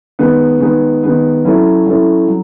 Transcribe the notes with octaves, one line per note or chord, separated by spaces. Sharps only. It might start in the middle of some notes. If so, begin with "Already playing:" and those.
D#3 G#3 B3
D#3 G#3 B3
D#3 G#3 B3
F#3 C#4 E4 A4
F#3 C#4 E4 A4
F#3